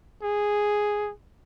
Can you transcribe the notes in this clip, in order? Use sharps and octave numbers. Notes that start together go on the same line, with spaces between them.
G#4